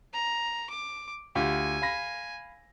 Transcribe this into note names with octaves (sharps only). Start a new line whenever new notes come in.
A#5
D6
D2 F4 G4 G#5
F5 B5 A#6